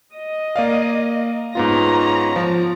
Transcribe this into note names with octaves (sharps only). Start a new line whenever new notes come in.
D#5
A#3 D5 F5
G#2 B3 C#4 F4 A#5
F3